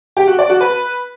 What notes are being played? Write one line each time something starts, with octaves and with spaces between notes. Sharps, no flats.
G4
F#4
D5
F#4
B4